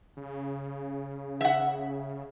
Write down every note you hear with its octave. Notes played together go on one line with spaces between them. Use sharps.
C#3
E5 F#5